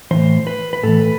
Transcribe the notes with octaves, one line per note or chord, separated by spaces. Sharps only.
A2 E3 C5
B4
B4
A2 E3 A4
B4